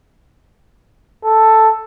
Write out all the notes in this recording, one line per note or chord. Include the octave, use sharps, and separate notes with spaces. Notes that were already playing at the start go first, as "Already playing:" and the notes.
A4